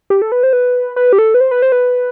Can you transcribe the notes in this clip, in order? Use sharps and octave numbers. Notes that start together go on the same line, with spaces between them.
G4
A4
B4
C5
B4
B4
G4
A4
B4
C5
B4
C5
B4